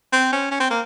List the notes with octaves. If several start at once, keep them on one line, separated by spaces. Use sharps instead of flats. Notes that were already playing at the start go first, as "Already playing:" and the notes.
C4
C#4
C#4
C4
A#3